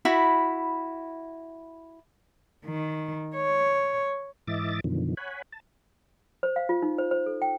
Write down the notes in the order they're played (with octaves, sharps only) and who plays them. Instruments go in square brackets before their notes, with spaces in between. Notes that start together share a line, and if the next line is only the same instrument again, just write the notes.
[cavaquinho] E4 F#4 B5
[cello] D#3
C#5
[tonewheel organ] G#2 E3 D#5 E5 D6 A6
F#2 B2 D3 D#3 F3
C#5 F#5 G#5 B5
A5
[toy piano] C5
F5
F4
D#4
C5
C5
A4
G5